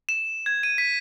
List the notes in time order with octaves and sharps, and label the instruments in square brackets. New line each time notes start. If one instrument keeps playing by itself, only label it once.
[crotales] E7
G#6
D#7
B6